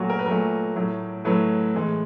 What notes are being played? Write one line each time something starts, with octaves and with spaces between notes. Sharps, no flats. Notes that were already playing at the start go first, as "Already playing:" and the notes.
Already playing: A#2 F#3 A3 F4 F#4
A#4
B4
A#2 F#3 A3 A#4
A2 F#3 A3
A2 F#3 A3 B4
A2 E3 G#3